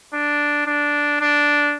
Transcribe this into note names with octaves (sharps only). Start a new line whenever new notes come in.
D4
D4
D4